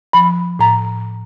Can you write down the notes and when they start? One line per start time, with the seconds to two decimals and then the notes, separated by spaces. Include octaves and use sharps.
0.13 F3 B5
0.59 A2 A#5